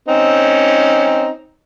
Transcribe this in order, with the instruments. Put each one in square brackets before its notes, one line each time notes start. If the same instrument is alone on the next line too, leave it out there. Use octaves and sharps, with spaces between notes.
[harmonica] C4 C#4 D#4